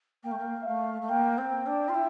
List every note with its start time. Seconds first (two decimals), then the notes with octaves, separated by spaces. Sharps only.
0.23 A#3 G5
0.31 A3
0.38 A#3
0.62 E5
0.66 A3 F5
1.01 A3
1.08 A#3 G5
1.38 C4
1.66 D4
1.88 F4
1.94 E4